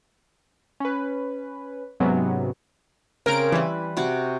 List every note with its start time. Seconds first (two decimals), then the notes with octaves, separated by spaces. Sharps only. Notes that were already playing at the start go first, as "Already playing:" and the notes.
0.80 C#4 B4
2.00 G#2 C3 F#3 B3 C#4
3.26 C#3 C4 A#4 D7
3.52 E3 G3 B4
3.97 C3 F#4 D6